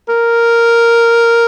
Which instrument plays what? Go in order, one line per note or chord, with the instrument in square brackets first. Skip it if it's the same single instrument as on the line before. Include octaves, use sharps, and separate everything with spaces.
[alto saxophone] A#4